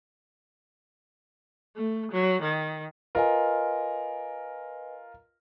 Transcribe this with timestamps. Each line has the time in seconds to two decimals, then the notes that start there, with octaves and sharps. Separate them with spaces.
1.76 A3
2.12 F#3
2.42 D#3
3.15 F4 A#4 B4 D#5 G#5